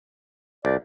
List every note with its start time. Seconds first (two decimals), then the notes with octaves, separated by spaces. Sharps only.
0.65 C2 D5